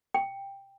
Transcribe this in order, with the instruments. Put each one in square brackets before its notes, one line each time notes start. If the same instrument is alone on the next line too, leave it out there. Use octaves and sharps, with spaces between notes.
[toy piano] G5